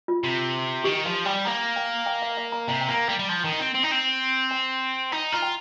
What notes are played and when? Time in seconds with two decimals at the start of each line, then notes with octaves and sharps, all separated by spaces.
0.08 F4
0.24 C3
0.84 D#3 G4
1.05 F3 F5
1.25 G3 G5
1.45 A#3 A#5
1.76 G5
2.06 G5
2.22 F5
2.37 F5
2.52 A#5
2.68 C3 A#5
2.81 G5
2.88 A#3
2.94 A#5
3.09 G3
3.19 G3
3.29 F3
3.44 D#3
3.52 D#4
3.60 C4
3.75 C4
3.84 D#4
3.92 C4
4.51 G5
5.12 D#4 A#5
5.32 F4 A#5
5.42 G5